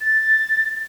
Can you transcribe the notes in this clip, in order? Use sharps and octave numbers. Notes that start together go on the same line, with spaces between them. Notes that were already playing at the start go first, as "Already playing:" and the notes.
A6